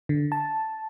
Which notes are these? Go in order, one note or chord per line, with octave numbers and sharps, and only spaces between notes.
D3
A5